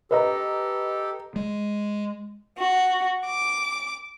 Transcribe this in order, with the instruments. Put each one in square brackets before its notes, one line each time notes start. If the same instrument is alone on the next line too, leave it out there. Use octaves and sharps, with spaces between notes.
[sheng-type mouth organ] G4 A4 [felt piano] B4 D#5 A#5
[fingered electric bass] G#3
[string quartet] F#4
D6